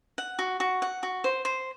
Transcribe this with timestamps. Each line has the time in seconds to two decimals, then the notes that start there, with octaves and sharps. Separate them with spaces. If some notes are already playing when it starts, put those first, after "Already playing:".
0.18 F#5
0.39 F#4
0.60 F#4
0.82 F#5
1.03 F#4
1.24 C5
1.45 C5